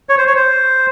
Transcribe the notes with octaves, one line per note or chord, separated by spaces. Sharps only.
C#5
C5
C#5
C5